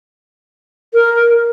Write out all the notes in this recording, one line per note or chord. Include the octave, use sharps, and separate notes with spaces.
A#4